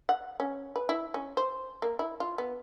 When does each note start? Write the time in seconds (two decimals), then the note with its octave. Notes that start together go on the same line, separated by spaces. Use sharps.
0.09 F#5
0.40 C#4
0.76 B4
0.89 E4
1.14 C#4
1.37 C5
1.82 A#3
1.99 E4
2.20 F4
2.38 B3